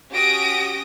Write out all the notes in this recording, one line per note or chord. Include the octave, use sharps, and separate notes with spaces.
C#4 F#4 G4 D#6 A#6 D7